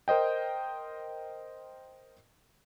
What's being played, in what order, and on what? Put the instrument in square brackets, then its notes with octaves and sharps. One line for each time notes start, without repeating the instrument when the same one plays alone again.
[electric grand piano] A#4 C5 D#5 G5